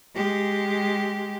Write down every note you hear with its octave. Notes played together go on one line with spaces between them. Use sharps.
G#3 G4